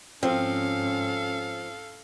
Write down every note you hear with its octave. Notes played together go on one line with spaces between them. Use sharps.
G#2 F3 C4 C#4 A4 F5